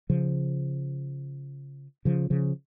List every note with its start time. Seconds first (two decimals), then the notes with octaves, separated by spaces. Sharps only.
0.10 C#3 F3
2.05 C#3 F3
2.30 C#3 F3